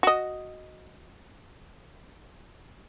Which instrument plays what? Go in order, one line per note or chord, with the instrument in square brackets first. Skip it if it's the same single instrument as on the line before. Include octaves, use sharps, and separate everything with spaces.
[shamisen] F#4 D#5